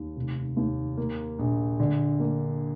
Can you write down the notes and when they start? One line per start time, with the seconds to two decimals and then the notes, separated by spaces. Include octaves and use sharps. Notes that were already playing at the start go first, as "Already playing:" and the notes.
Already playing: D#2
0.16 F1
0.57 D#2
0.97 A#3
1.39 A#1
1.80 D3
2.20 A#3